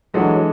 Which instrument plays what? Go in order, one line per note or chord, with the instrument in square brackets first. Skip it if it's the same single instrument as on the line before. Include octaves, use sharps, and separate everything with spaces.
[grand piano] E3 G#3 D4 A4 D5 [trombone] F#3